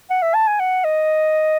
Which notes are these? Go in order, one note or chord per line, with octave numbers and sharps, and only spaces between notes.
F#5
E5
A5
G#5
F#5
D#5